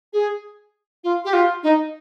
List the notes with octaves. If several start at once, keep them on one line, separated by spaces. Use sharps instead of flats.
G#4
F4
G4
F4
D#4